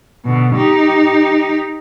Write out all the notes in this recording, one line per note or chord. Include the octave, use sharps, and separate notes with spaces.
B2 D3
D#4 G4